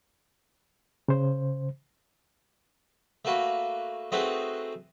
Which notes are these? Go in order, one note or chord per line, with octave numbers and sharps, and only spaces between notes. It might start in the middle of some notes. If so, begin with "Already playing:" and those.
C#3 C5
A3 A#3 F#4 B4
A3 C4 D#4 F#4 G#4 B4